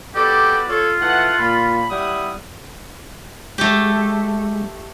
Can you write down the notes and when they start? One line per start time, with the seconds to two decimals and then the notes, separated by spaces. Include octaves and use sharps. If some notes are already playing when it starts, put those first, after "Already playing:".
0.15 B3 F#4 G4 A4 D5
0.69 F4 A4 C#5
1.01 E3 A3 F#5
1.39 A#2 B5
1.91 G3 E4 F#5 D#6
3.58 G#3 A3 F#4 G4